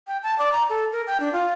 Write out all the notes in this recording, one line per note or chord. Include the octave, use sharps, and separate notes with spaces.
G5
A5
D5
A#5
A4
A#4
G5
D4
F4